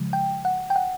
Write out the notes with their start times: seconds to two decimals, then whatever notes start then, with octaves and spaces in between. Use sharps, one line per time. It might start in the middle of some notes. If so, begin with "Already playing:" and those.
Already playing: C#3 F3 G#3
0.13 G5
0.45 F#5
0.70 G5
0.76 F#5